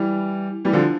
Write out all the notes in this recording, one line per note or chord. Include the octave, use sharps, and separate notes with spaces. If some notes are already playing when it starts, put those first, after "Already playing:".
Already playing: E3 G3
E3 G3
D3 F3